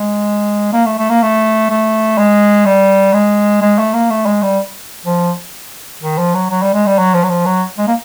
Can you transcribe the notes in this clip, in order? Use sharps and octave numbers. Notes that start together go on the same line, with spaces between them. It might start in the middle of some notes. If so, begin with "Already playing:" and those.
Already playing: G#3
A#3
A3
A3
A#3
A3
A3
G#3
G3
G#3
G#3
A3
A#3
A3
G#3
G3
F3
D#3
F3
F#3
F#3
G3
G#3
G3
F#3
F3
F#3
F3
F#3
G#3
A#3